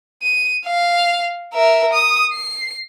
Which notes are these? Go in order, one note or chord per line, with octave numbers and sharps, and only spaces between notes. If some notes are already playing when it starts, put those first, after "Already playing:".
D#7
F5
A#4 E5
D#6
C7